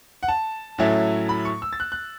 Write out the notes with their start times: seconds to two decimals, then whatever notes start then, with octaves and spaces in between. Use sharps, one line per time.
0.23 F#5
0.28 A5
0.78 A2 F#3 A3 C#4 E4
1.29 B5
1.45 C#6
1.62 E6
1.73 A6
1.80 F#6
1.92 F#6